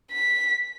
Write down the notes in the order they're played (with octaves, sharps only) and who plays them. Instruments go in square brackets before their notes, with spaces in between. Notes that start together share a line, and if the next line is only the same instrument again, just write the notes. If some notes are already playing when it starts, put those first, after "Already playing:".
[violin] B6